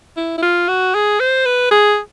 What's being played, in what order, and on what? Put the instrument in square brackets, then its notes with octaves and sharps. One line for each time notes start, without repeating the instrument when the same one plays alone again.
[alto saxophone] E4
E4
F4
F#4
G#4
C5
B4
G#4